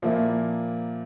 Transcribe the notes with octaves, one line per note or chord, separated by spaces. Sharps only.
A#2 F3 A#3 E4